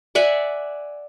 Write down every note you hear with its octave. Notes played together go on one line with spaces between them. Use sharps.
D5 E5 F#5 G#5